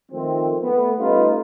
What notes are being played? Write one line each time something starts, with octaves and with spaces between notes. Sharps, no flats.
D#3 F3 A3 C4
A3 B3
G3 A3 C#4 D#4 F4 B4